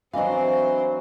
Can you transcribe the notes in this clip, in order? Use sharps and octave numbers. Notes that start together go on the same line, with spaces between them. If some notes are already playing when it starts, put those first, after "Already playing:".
E3 F#3 C4 D4 C5 D#5 F5